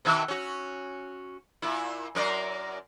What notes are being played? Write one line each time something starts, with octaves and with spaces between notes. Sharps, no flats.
B2 D#3 E5
C#4 F#4
A#2 E4
F#2 A#4 D5